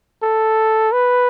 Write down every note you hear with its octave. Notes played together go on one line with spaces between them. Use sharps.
A4
B4